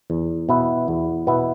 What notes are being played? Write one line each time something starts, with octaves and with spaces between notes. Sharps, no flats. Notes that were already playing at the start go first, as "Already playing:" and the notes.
E2
B2 B3 E4 B4
E2
B2 B3 E4 B4